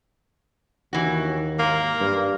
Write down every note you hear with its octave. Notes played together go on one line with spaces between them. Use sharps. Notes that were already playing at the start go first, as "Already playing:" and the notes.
D#2 E3 F#4
G#2 A#3
G2